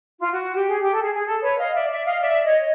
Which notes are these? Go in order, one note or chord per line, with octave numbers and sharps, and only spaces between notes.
F4
F#4
G4
G#4
G4
A4
G#4
G#4
A4
B4 C#5
D#5 F5
D5 E5
D5 E5
D#5 F5
D5 E5
C#5 D#5